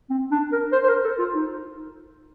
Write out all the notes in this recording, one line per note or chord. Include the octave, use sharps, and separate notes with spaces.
C4
D4
A#4
C5
C5
A#4
A4
F4
D#4